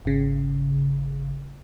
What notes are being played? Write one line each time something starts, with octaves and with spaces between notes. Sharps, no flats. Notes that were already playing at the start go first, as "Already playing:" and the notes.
G#1 C#3